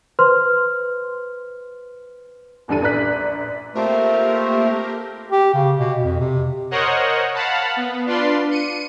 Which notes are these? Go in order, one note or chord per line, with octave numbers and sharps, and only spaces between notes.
B4 C5 C6 F6
F#1 E2 G2 D4 A4 D#7
A#1 B4 D5 A#5 F#6 B6
A3 A#3 C4 F4 G4 A#4 C5
G4
C#3
B2
F2
C3
A#4 C5 C#5 D#5 F#5
F5 F#5 A5 B5
B3
D4 F4 B4 D5 C6
C#7 D#7